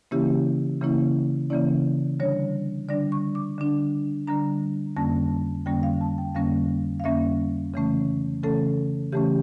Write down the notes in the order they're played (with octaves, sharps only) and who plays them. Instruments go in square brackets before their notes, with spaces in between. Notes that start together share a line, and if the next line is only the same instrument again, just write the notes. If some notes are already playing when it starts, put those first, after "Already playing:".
[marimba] C#3 E3 A#3 C#4 E4 G4
C#3 E3 A#3 C#4 E4
C#3 E3 A#3 C#4 E4 D5
D3 G3 D4 C#5
D3 G3 D4 D5
C#6
D6
D3 G3 D4
D3 G3 D4 A#5
F2 D3 G3 A#3 C#4 A5
F2 D3 G3 A#3 C#4 G5
F5
A5
G5
F2 D3 G3 A#3 C#4 F5
F5
F2 D3 G3 A#3 C#4 E5
C#3 E3 A3 C#4
C#3 E3 A3 C#4 A4
C#3 E3 A3 C#4 G4